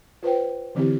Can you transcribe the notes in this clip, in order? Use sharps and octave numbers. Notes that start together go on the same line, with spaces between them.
F4 B4 C5 G5
D3 E3 C4 E4 G4